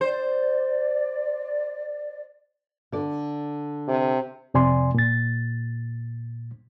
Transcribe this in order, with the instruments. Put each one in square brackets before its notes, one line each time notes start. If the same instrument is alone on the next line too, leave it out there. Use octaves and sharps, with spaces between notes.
[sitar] C5 [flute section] D5
[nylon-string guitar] D3 D5
[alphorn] C3
[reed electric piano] F2 C3 D5 G#5 C6
A#2 A6